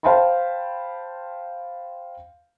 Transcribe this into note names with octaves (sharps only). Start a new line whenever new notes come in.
C5 F5 G5 A5 B5 C6